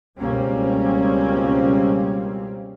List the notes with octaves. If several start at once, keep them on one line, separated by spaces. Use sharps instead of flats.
C#2 B2 G3 A#3 C4 C#4